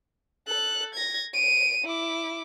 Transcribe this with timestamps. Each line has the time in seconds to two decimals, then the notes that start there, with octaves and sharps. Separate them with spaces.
0.47 A4 F#6
0.94 G#6 A#6
1.34 D7 D#7
1.84 E4 D6